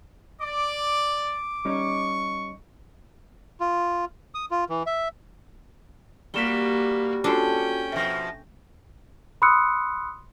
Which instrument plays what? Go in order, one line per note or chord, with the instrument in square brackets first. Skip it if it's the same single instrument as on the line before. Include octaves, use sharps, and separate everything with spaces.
[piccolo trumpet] D5 [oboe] D6
[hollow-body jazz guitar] G3 C#4 D#4 [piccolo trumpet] C#6
[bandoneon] F4
D#6
F4
E3
E5
[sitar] G3 [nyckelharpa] A#3 F#4 [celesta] B6 E7 G7
[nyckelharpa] C#4 G5 [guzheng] D4 A4 C5 [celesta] F4 F#4
[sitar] B2 F3 [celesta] E5 A#6
[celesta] B5 C6 D#6 E6 F#6 C#7